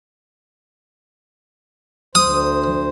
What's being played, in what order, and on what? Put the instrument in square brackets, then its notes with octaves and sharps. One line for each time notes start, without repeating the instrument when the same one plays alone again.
[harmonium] D2 C5 [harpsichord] D#6